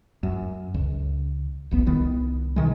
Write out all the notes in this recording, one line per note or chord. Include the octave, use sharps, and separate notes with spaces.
F#2
C#2
D1 A#1 B3
C2 D#3 B3
B2 D#3 G#3